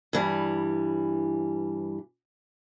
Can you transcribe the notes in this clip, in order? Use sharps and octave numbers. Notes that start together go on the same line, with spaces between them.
G2 E3 G3